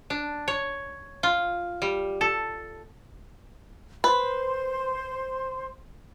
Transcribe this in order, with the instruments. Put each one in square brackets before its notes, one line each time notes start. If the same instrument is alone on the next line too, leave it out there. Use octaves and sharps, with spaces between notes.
[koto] D4
C#5
F4
G3
A4
[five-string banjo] B4 [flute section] C5 C6